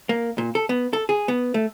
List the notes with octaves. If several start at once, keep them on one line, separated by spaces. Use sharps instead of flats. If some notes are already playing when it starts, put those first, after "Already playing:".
A#3
A#2
A4
B3
A4
G#4
B3
A3